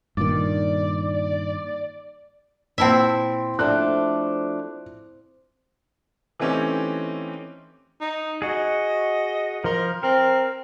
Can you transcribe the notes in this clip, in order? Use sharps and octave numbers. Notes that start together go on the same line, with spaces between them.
G2 A#2 D#3 D5
A#2 C4 E4 E5 A5
F3 A3 D4 F#6
E3 A3 C4 C#4 D#4 G4
D#4
F#4 G#4 D#5
F3 A#4 C6
C4 A#4